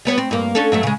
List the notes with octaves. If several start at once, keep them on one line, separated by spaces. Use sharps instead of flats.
G3 B3 C#5
C4
G2 A#3
C#4 D4 A4
G2 F#3 A3
C#3 G#3